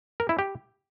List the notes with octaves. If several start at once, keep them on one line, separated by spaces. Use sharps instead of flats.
A#4
E4
G4